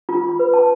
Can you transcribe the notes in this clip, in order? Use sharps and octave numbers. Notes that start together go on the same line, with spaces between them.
F4
B5
B4
A5